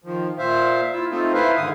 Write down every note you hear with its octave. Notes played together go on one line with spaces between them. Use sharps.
D#3 F3
A#2 C5 E5 F5
E4 F4 E6
A3 C4 D#4 F4
E4 B4 C5 E5 F5
G#2 D3 D#3 D#6